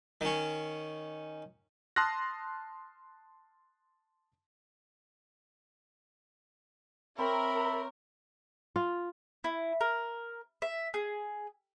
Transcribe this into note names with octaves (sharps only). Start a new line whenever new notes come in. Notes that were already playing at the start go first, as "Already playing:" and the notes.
D#3 C#4
A5 C6 D#6 F6 F#6 A#6
C4 A#4 C#5 E5 B5
F4
E4
A#4
E5
G#4